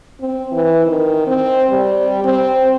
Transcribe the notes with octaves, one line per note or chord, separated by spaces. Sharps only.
C4
E3
D#3
C4
G3
C4